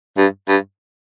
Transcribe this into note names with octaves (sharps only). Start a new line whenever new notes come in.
G2
G2